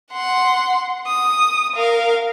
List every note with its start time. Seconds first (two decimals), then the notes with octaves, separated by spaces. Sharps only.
0.12 F#5 C6
1.07 D#6
1.76 A#4 F5